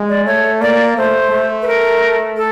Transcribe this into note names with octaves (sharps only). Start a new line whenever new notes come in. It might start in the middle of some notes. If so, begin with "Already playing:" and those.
Already playing: G#3
D5
A3 C#5
A#3 D5
A3 C5
A3
B4
A#4
A4